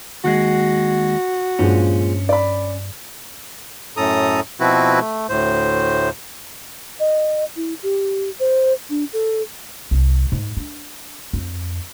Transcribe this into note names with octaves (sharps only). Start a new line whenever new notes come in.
D#2 G#3 F#4 F#5 F#6
G2 A#2 F3 G#3 C#4 G5
D5 B5
F#2 A2 A4 A#5 D#6
B2 F3 C4 E4 F#4 B4
A3
D2 A2 C5
D#5
E4
G4
C5
D4
A4
C2
G#2
D4
F2